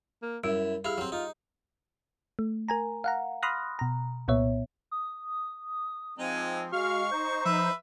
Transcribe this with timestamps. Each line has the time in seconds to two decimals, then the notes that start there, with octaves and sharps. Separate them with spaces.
0.22 A#3
0.44 F#2 G3 E4
0.85 E4 G4 G#4 F5
0.98 F#3 C4
1.12 D#4 F4
2.39 A3
2.68 A#4 G#5 A#5
3.04 F5 F#5 A#5
3.43 B5 C6 D#6 F6 F#6 A#6
3.79 B2 A#5
4.28 C2 A#2 B3 C#5 E5
4.91 D#6
6.19 F3 G#3 C4 D#4
6.72 G#3 F#4 F5 C#6 F6
7.11 D#4 C5 G6
7.45 F3 B4 E5